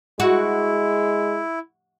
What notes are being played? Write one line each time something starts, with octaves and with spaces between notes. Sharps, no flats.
G#3 E4 F#4